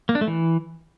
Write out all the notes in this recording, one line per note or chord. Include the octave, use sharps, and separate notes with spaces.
A#3
D4
A3
E3